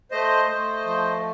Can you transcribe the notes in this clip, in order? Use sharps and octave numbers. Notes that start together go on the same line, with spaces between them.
A3 C5 D#5
A3
F3